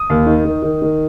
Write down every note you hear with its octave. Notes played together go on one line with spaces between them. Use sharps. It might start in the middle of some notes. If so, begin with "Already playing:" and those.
Already playing: D#6
D#2
D#3
D#3
D#3
D#3